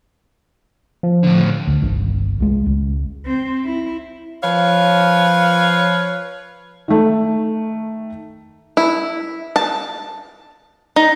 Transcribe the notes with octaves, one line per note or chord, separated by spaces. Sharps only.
F3
A2 D3
D2
G1 C2 D#3
C2 G#3
C#2
C4
E4
F3 B4 C#5 F5
D#3 A3
E4
A5
D#4